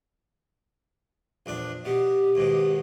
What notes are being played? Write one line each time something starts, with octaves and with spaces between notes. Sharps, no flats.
A#1 E2 D4
B2 G4
D#2 G#2 B2